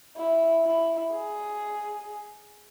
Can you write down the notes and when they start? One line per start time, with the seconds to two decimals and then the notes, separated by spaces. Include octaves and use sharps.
0.17 E4
0.65 E4
1.12 G#4